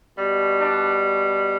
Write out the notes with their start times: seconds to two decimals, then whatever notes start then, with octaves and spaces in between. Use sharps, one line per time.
0.18 B2 G3
0.59 D4